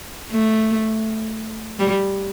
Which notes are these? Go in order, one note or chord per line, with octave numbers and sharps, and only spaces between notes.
A3
G3